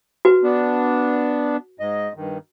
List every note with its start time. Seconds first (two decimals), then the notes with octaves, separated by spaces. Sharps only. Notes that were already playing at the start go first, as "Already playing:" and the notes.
0.25 F#4 B4
0.43 B3 D4
1.80 G#2 D#5
2.16 G2 D#3